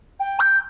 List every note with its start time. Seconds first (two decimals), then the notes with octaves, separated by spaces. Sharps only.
0.20 G5
0.40 G6